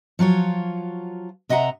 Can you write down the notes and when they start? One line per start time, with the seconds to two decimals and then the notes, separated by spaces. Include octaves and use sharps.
0.19 F3 F#3 F4 C#5
1.49 C3 D#5 E5 F#5 A#5